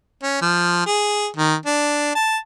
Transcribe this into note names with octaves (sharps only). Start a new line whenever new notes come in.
C#4
F3
G#4
D#3
D4
A5